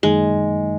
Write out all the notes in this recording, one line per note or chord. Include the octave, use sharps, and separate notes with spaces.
F#2 D#3 F#3 G#3 A#3 D#4